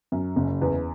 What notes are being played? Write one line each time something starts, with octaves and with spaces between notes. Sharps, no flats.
F#2
F#1
E2